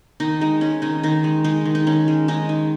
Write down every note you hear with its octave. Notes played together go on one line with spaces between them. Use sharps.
D#3 D#4
G#3 D#4
G#3 C#4
D#3 D#4
D#3 D#4
G#3
G#3 D#4
D#3
D#4
D#3 C#4
G#3
G#3 D#4
D#3